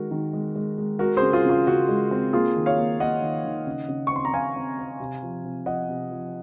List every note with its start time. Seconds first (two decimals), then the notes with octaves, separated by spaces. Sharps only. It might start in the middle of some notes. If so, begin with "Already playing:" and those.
Already playing: D#3 G#3 F#4 A#4
0.11 D#3
0.33 G#3
0.55 G#3
0.78 G#3
0.99 G#3 F#4 A#4
1.17 C#3 G#4 C5
1.33 F4 G#4
1.45 C#3 F4
1.67 C#3 F#4
1.89 G#3
2.11 C4
2.33 A#3 F4 G#4
2.56 D#3
2.66 C#5 F5
2.77 A#3
2.99 A#3 D#5 F#5
3.22 D#3
3.44 D#3
3.67 C#3
3.89 C#3
4.07 C#6
4.11 C4 C6
4.25 A#5
4.34 C#3 F5 G#5
4.56 C4
4.77 C4
5.00 C3
5.23 F3
5.44 C3
5.66 F3 D#5 F#5
5.89 C3
6.11 F3